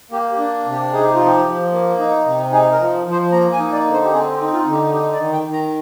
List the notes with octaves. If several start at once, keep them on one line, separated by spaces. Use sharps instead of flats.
A#3 G4
G4
D4
C3
G4
D#4 G#4
G4
F3 F4
G4
F3
A#3
D#4
C3
D#4 G#4
A#4
F3
F3
C5
A#3 A#5
G#5
D#4
D5
D3
C5
G4
C4 G#4
G4
D#4
F4
D3
G4
D#4 G4
D5
D#3
G5
D#3
A#5